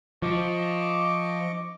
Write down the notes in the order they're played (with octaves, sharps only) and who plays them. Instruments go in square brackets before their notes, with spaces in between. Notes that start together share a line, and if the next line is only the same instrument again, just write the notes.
[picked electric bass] F3 [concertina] D#5 C#6 D6